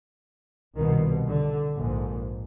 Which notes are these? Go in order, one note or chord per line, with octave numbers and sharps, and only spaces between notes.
C2 B2 D#3
D3
A#1 G#2